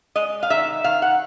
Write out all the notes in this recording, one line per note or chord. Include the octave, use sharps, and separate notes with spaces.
G#3 D#5
F5
D#3 E5
D#3 F5
F#5